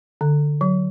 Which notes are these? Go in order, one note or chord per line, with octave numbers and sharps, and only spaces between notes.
D3
F#3